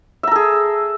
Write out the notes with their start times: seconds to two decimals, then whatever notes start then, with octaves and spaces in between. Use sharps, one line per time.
0.23 E5
0.27 A#5
0.32 A4
0.36 G#4